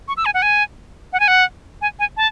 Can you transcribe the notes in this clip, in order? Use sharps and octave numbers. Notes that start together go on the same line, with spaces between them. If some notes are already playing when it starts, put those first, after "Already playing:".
C#6
E6
G#5
F#5
G#5
F#5
G#5
F#5
G#5
G#5
A5